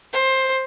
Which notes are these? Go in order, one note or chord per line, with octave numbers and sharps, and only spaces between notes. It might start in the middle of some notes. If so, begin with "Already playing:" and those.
C5